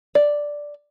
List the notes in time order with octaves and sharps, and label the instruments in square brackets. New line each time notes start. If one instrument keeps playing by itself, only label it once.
[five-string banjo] D5